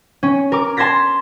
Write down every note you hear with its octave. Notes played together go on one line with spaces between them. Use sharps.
C#4
A#4 D6
A5 C6 G#6 A#6 B6